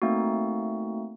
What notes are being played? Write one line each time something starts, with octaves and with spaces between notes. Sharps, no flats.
A3 A#3 C4 D#4 F#4